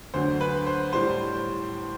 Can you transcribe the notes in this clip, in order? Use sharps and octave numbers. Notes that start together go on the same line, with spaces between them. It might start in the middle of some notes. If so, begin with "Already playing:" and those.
D2 D3 F#3 C5
B4
C5
A2 G3 C5